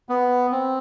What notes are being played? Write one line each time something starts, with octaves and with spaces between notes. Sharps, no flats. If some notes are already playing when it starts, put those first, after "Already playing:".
B3
C4